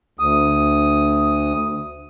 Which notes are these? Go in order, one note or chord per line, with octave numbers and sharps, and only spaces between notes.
D2 D#6